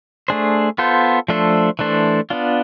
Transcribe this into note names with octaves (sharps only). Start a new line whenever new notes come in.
A3 D4 G#4 C5
B3 F4 A4 C5
F3 A3 D4 A4 C5
E3 A3 D4 A4 C5
B3 D4 F4